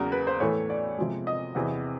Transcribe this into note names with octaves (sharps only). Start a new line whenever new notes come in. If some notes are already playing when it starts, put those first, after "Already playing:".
Already playing: E2 C#3 F#3 A#3 A#4
B4
C5
A2 E3 A3 C#5
D5
C3 F3 G#3
D#5
E2 C3 E3